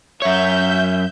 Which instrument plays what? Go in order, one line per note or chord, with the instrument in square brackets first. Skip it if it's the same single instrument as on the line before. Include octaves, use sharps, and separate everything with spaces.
[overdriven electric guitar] F#2 C#5 [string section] E5 G6